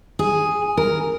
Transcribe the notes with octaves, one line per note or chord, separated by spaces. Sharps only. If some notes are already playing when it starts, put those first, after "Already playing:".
G#4
A#4